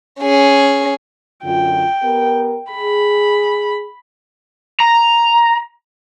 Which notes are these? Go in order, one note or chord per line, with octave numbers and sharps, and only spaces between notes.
C#4 G#4
F#2 D3 F4 G5
B3 G4 A#4
G#4 B5
A#5